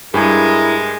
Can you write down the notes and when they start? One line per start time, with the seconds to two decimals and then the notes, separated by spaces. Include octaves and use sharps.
0.14 G2 G#3 E4 G#4 A#4 G#5 G#6